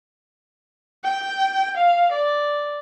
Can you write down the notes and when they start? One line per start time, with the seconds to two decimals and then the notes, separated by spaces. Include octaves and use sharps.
1.05 G5
1.77 F5
2.12 D5